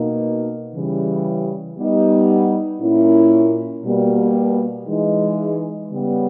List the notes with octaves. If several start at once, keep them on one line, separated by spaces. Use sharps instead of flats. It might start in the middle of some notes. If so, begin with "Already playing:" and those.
Already playing: B2 A#3 D#4
C#3 E3 G3
G3 B3 D#4
A#2 A#3 C#4 E4
B2 G3 A#3
E3 G#3 D#4
C#3 G3 B3